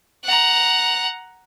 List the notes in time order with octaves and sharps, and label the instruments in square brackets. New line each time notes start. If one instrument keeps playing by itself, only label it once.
[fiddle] F#5 A#5